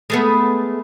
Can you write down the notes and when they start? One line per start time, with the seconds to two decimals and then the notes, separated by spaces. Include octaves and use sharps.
0.10 G#3 A3 B3